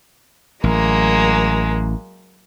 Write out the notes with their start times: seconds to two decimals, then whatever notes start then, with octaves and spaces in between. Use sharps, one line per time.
0.64 A1 F#3 G#3 A#3